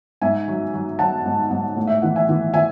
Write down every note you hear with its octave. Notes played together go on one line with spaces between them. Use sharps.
G#2 E5 G#5
F#3
F#3
F#3 F#5 A5
G#2
G#2
A2
E5
E3 F#5
E5 G#5
E3
E3 E5 G#5